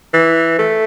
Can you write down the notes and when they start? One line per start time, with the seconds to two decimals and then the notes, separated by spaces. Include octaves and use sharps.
0.13 E3
0.58 A3